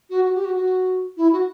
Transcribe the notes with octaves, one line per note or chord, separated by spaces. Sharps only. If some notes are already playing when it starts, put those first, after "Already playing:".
F#4
F#4
G4
F#4
F#4
E4
F#4